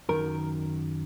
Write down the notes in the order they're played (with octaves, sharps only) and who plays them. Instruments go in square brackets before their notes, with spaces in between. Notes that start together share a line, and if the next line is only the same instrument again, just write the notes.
[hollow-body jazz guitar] F#2 D#3 A#4